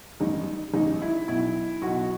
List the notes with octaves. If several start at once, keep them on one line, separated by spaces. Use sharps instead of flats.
A1 G2 D#3 D#4
A1 G2 D#3 D#4
E4
B1 B2 E4
B1 B2 F#4